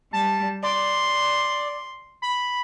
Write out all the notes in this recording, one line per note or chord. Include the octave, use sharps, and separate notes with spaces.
G3 A5
D5 C6
B5